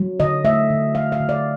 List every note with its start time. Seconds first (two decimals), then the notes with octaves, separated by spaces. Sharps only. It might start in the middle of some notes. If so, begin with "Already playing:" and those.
Already playing: F#3
0.20 D3 D#5
0.44 A3 E5
0.70 D3
0.95 F#3 F5
1.12 F5
1.20 D3
1.29 D5